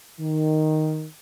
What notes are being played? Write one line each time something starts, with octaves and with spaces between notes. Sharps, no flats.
D#3